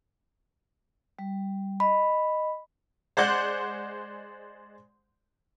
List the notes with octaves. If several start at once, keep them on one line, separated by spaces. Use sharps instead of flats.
G3
D#5 B5
G#3 C5 D5 F#5 G6